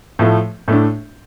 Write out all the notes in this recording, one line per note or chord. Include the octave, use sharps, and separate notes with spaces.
A2 F3 A3
A2 A3 D4